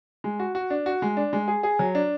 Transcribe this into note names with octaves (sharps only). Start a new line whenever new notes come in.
G#3
F#4
F#4
D4
F#4
G#3
D4
G#3
G#4
G#4
F#3
D4